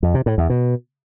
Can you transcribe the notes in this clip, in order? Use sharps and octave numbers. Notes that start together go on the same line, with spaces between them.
F2
C3
A2
E2
B2